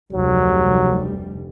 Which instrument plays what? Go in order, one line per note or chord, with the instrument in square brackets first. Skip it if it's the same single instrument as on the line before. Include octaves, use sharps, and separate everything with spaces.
[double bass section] F1 D2 G3 [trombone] F#3